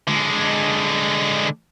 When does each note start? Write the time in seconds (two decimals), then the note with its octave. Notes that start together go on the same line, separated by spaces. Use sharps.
0.07 D3 G#3